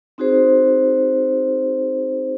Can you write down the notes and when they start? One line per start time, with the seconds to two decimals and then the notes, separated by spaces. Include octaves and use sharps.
0.18 C4 D#4 F#4 G#4 C5